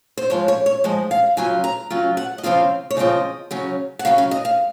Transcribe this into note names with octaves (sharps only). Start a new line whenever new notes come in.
C5
G#2 F3 G#3 C#5
C#5
C#5
G#2 F3 G#3 D#5
F5
C#3 F#3 C#4 F4 G#5
A#5
C#3 F#3 C#4 F4
F#5
D#5
C#3 F3 C4 F4 F5
C#5
C#3 F3 C4 F4 D#5
C#3 F#3 C#4
F#5
C#3 F#3 C#4 F5
F5
D#5
F5